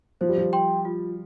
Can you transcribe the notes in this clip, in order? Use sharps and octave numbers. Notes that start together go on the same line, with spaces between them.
F3 C5
G3
F3
G5 C6
F4